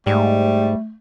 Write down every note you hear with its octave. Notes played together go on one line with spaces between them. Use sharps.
G#2 G3 A3